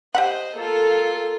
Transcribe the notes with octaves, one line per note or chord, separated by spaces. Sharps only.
G4 C5 D#5 E5 F#5
A#3 F4 A4